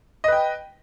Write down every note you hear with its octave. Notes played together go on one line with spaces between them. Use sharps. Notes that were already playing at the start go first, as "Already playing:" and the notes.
B4 D#5 G5